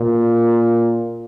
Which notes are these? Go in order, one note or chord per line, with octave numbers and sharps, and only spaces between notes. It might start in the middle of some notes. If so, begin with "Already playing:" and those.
Already playing: A#2